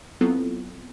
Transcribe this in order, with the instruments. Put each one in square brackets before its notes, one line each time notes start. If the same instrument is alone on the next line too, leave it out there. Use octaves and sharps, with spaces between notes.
[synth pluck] F#3 B3 C4 E4 F4 A4